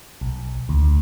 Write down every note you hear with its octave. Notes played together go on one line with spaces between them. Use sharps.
B1
D2